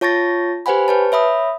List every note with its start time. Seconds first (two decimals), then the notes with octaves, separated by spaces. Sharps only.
0.01 F4 C#5 A5 C#6 A6 A#6
0.66 G4 B4 C5 F#5 G#5 B5
0.88 B4 C#5 A5
1.12 C#5 E5 B5 D#6